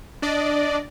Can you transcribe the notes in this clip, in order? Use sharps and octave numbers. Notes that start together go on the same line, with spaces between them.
D4 D5 D#5